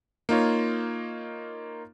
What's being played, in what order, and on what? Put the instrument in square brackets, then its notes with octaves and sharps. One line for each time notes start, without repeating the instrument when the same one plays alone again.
[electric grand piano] A#3 D#4 F4 C#5